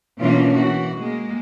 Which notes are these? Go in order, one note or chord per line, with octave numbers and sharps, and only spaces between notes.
B2 E3 A#3 C#4 D4 F4
E3 F#4
G#3 A#3